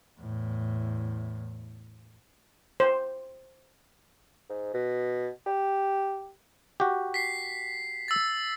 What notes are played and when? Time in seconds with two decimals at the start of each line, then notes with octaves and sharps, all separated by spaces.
0.20 E2 A2
2.80 C5
4.49 G#2
4.74 B2
5.46 G4
6.80 F#4 G4
7.14 B6 C7
8.08 E6 A6